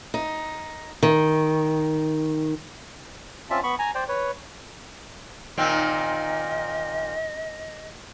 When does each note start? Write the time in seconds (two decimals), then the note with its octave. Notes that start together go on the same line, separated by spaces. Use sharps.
0.14 D#4
1.03 D#3
3.50 C4 C#4 F4 D5 E5 A5
3.63 B3 B5 C#6
3.79 G#5 A#5
3.95 C5 D5 G5
4.08 B4 C#5
5.58 A#2 D#3 C4 D#5